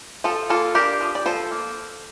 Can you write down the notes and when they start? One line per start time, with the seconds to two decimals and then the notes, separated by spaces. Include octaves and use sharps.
0.24 F3 F4 A4
0.50 A#3 F4 A4
0.75 D4 G4 A#4
1.01 F3
1.15 D5
1.26 F3 A4 C5
1.51 A#3